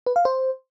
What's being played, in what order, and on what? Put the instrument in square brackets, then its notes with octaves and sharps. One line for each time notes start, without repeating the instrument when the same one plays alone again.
[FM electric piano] B4
F5
C5